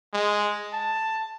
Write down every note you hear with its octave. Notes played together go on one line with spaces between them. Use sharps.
G#3
A5